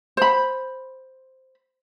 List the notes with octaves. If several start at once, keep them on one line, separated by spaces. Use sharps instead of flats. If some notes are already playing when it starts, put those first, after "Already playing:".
C5 B5